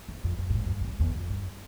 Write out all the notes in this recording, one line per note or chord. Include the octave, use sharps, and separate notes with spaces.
E2
F2
F#2
G2
G#2
F#2
G2
F2
F#2
E2
F2
G2